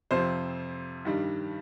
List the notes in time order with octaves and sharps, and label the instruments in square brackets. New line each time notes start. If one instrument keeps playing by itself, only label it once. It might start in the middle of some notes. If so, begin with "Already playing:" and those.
[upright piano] F2 C3 F3 C4 C5
G2 D#3 G3